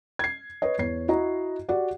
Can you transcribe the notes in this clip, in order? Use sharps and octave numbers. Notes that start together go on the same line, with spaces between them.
G#6 C7
B4 C#5 D#5
E2 C#5 C7
E4 F#4 D#5 A#5
F#4 G4 D5 F#5